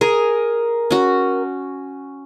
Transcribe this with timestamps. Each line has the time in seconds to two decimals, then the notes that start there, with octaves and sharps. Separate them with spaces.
0.01 G#4 A#4
0.91 C#4 F#4